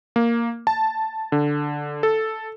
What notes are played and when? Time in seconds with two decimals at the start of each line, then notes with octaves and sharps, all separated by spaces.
0.16 A#3
0.67 A5
1.32 D3
2.03 A4